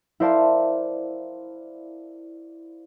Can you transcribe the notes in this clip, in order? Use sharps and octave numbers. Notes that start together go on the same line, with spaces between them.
E4 A#4 C5 D5 F5 A5